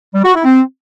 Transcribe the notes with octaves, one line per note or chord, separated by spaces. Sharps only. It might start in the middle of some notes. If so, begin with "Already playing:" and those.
G3
F#4
E4
C4